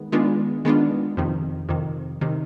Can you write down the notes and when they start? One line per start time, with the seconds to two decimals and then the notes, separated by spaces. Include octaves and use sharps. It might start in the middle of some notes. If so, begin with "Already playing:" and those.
Already playing: D#3 G#3 B3
0.12 D#3 G#3 B3 D4 F4
0.65 D#3 G#3 B3 D4 F4
1.17 F2 C3 D#3
1.69 F2 C3 D#3
2.21 C3 D#3